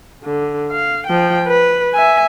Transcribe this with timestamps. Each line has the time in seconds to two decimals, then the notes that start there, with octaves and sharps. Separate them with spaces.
0.24 D3
0.71 F5
1.07 F3 G5
1.47 B4
1.94 E5 G#5